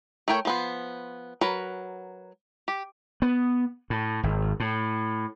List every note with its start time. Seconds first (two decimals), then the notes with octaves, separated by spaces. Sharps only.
0.28 A3 E4 A#4 C#5 G5
0.45 F3 B3 C5
1.41 F#3 A#4 B4
2.68 G4
3.22 B3
3.90 A2
4.23 G#1
4.60 A2